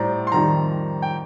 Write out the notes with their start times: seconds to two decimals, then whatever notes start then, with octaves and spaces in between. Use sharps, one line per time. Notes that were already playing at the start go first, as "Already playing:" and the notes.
Already playing: A2 G3 C5 D5 A#5
0.27 C6
0.32 F2 D#3 G3 A#5
1.02 G5